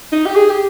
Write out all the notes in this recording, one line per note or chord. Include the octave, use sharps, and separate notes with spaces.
D#4
G4
G#4
G4